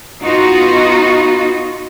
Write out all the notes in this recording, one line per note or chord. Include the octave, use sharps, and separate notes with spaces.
B3 D#4 F4 F#4